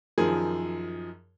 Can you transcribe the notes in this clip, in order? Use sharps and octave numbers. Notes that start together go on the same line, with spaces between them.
F#2 D#3 F3 G#4